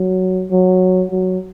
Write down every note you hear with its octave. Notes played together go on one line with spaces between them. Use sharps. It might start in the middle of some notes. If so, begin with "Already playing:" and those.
Already playing: F#3
F#3
F#3